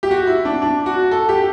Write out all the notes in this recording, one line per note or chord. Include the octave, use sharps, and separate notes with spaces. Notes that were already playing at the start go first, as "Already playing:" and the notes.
G4
F#4
E4
D4
D4
F#4
A4
G4